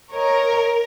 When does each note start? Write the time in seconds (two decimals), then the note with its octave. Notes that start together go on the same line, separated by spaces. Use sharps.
0.11 A#4 C#5 D#5